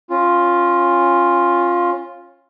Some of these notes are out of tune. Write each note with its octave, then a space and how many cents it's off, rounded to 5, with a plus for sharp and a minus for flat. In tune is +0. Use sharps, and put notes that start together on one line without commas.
C#4 -25 F4 +0